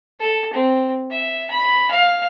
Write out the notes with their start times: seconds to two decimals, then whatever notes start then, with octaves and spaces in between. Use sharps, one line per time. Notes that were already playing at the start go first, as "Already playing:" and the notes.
0.20 A4
0.54 C4
1.11 E5
1.51 B5
1.91 F5